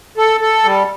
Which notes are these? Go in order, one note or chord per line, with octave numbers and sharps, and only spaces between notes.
A4
A4
G3